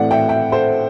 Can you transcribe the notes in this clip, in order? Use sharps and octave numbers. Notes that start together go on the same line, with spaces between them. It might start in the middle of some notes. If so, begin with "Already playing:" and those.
Already playing: A2 E3 A3 C4 D5 F#5
E5 G5
E5 G5
A4 C5